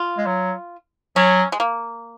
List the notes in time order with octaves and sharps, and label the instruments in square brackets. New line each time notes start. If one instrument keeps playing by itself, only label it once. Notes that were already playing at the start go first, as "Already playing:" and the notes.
Already playing: [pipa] F4
[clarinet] G#3
F#3
[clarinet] F#3 [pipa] C#4
[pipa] G#3
A#3